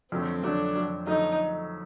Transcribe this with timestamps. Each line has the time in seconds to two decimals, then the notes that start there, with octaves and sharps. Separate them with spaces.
0.12 F2 D3 F#3 A3 C4
0.43 F2 D3 F#3 A3 D4
0.76 F2 D3 F#3 A3
1.07 F2 D3 F#3 A3 D#4